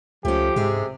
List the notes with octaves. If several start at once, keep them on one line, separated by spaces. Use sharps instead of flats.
C#2 F3 A3 C#4 G4
G#2 C3 G#3 G#4